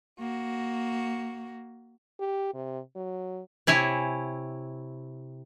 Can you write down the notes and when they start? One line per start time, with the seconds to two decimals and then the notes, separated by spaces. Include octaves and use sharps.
0.19 A#3 F#4
2.19 G4
2.54 C3
2.96 F#3
3.67 C3 E4 C#5 G#5